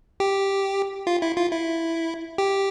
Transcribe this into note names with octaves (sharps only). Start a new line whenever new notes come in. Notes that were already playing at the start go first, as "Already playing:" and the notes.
G4
F4
E4
F4
E4
G4